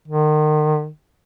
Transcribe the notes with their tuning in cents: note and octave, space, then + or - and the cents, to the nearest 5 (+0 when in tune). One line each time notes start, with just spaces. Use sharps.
D#3 -35